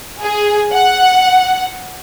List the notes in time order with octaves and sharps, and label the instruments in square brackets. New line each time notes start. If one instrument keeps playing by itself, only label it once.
[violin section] G#4
F#5